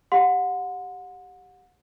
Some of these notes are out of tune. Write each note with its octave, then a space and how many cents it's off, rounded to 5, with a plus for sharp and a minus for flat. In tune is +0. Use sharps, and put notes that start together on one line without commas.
G4 +0 F#5 -30 C6 -25